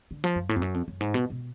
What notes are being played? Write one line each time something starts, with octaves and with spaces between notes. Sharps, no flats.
D3
F3
F#2
A2
F2
F#2
F2
F#2
G#2
B2
B2